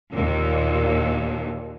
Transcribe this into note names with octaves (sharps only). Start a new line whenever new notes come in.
D#2 A#2